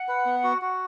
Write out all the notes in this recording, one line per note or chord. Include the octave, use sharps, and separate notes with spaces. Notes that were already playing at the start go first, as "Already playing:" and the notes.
Already playing: F#5
B4
B3
F#4
F#4